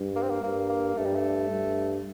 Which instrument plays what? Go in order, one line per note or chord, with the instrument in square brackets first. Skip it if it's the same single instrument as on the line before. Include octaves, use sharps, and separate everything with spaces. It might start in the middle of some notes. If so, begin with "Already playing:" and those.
Already playing: [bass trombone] G2
[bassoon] A#3
C4
A#3
[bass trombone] G2 [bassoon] A#3
[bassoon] A#3
[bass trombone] G2 [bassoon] A3
[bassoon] G3
A3
[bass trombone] G2